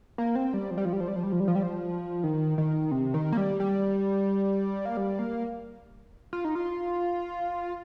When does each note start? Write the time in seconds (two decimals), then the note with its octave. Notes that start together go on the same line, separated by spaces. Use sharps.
0.18 A#3
0.35 C4
0.54 G3
0.71 F3
0.78 G3
0.85 F3
0.93 G3
1.00 F3
1.08 G3
1.16 F3
1.23 G3
1.32 F3
1.40 G3
1.48 F3
1.55 G3
1.63 F3
2.24 D#3
2.58 D#3
2.91 C3
3.14 D#3
3.32 A#3
3.37 G3
3.60 G3
4.85 A#3
4.97 G3
5.19 A#3
6.33 F4
6.45 D#4
6.55 F4